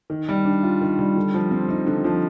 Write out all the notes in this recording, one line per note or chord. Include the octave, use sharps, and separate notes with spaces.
D#3
G3
D4
F4
D#3
G3
D3
F3
C4
D#4
D3
F3